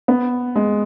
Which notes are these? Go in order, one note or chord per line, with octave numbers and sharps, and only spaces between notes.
B3
G#3